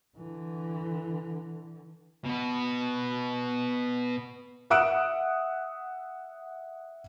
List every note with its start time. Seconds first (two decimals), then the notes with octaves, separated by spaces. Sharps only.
0.18 D3 E3
2.26 B2 B3
4.70 E5 F#5 D#6 E6 F#6 D7